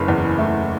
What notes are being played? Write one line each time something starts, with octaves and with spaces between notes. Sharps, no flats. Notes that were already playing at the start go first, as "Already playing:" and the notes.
Already playing: F#1 C#3 B4
E2
A3